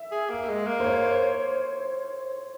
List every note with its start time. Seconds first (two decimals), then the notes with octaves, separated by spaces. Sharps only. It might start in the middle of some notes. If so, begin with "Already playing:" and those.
Already playing: E5
0.12 G#4
0.29 A#3
0.49 G#3
0.67 A#3
0.80 C5
0.84 C#5